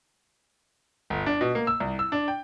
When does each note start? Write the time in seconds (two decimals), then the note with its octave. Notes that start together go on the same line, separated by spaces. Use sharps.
1.10 G1
1.26 D4
1.41 B2
1.55 A#3
1.67 E6
1.80 C2
1.99 E6
2.12 D4
2.28 G5